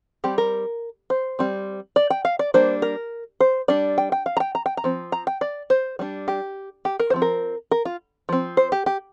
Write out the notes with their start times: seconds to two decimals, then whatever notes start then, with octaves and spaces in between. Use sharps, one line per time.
0.24 G3 C4 G4
0.38 A#4
1.10 C5
1.39 G3 C4
1.96 D5
2.10 G5
2.25 F5
2.39 D5
2.54 G3 A#3 D4 C5
2.82 A#4
3.40 C5
3.68 G3 D4 D5
3.98 G5
4.12 G5
4.26 F5
4.37 A#5
4.40 G5
4.55 A#5
4.66 G5
4.77 A#5
4.84 F3 C4
5.12 A#5
5.27 G5
5.41 D5
5.70 C5
5.99 G3 D4
6.28 G4
6.85 G4
7.00 A#4
7.10 C5
7.14 F3 C4
7.22 A#4
7.71 A#4
7.85 F4
8.29 F3 C4
8.57 C5
8.72 G4
8.86 G4